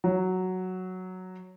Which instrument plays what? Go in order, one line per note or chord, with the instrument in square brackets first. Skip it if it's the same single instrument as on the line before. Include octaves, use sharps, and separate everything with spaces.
[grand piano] F#3